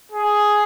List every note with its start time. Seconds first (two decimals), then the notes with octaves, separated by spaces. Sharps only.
0.12 G#4